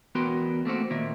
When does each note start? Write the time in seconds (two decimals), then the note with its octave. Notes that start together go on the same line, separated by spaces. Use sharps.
0.15 E2 B3 F#4 A#4 G5 C6
0.65 A3 A#3 C4 F#4
0.90 A#2 D#3 A#3 E5